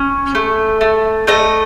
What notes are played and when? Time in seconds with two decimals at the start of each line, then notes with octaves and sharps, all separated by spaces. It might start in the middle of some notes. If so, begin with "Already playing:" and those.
Already playing: C#4
0.35 A3
0.81 A3
1.27 A3 D#5